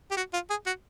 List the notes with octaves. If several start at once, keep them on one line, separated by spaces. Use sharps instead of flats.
G4
F#4
F4
G#4
F#4